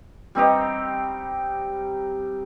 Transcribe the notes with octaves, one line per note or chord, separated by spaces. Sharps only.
G3 C4 D#4 G4